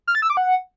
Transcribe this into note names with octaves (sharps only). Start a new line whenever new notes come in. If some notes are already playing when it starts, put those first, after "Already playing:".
F6
A6
E6
D6
F#5